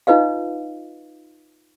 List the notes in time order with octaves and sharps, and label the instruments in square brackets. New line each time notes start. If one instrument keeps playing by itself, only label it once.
[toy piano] D#4 F4 B4 D#5 F5